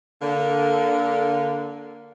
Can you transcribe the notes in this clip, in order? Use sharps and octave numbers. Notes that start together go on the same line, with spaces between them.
D3 A#3